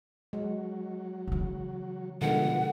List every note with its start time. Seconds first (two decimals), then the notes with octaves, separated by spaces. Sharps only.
0.33 F#3 G#3
1.28 C#3 E3
2.22 B2 D3 D#3 F3 G3 G#3 F#5